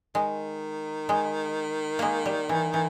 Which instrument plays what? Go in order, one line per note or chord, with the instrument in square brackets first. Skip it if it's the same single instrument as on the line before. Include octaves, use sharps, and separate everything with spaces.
[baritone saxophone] D#3 [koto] G#3
[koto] G#3
G#3 A#3
G3
E3
E3